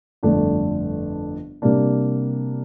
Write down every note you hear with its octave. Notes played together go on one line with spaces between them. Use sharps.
G1 F2 D3 A3 D4
C3 G3 A#3 D4